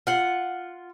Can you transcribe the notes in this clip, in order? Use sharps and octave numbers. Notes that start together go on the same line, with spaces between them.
F4 F#5